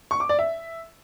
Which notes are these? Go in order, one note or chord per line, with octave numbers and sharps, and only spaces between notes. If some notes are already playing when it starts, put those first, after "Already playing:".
C#6
D6
D5
E5